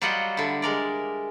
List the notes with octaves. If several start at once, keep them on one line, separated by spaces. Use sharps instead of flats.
F#3 G3 F4 G4 D#5 F#5
D3 E4
G#3 A#4 D5